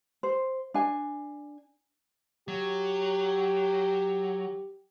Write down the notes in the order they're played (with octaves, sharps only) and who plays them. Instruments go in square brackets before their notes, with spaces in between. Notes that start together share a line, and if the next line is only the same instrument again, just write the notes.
[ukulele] C5
D4 G#5
[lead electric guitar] F#3 [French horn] G4